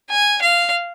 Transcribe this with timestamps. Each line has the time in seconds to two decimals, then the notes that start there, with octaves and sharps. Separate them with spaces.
0.10 G#5
0.42 F5